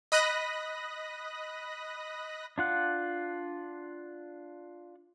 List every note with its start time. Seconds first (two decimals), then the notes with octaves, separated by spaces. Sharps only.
0.12 D#5 B5 D#6 F#6 A#6
2.58 D4 F4 F#5